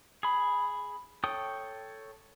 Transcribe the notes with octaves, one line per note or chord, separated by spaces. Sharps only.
G#4 B5
A4 C#5 G5 D#6